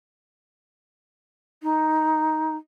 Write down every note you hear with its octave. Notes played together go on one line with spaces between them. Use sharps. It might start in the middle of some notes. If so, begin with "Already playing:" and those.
D#4